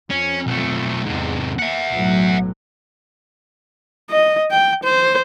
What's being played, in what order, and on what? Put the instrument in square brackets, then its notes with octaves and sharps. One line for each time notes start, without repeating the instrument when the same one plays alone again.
[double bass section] F2 [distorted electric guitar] C#4
[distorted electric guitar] B1 A3
[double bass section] E2 [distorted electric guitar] G#2 C3
[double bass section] A#3 [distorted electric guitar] E5 F#5
[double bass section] B1 A2 F#3
[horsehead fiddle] D#5
G5
C5